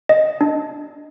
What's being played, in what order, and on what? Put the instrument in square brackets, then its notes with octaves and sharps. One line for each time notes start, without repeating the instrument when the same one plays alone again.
[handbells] D#5
D4